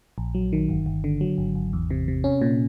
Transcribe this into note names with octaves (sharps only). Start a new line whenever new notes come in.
A#1
F#3
D#3
G1
G1
D3
F#3
G#1
G#1
E2
C3
C3
C#4
A#2